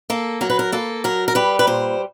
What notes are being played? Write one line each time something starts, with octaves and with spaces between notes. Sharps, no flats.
A#3 A4
F#3 A#4
B4
A#4
A#3 A4
F#3 A#4
A#4
G3 B4
B4
A#2 C5